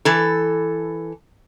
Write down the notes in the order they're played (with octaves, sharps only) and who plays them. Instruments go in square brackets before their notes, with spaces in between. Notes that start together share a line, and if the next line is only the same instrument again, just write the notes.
[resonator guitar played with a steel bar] E3 A4